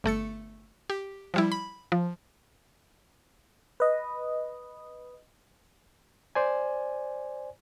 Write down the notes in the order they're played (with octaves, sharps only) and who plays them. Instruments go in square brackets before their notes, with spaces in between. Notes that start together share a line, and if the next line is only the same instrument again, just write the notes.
[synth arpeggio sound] G1 A3 A4 C#7
G4
F3 G3 E4
B5
F3
[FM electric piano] B4 D#5
[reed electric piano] C5 D5 G#5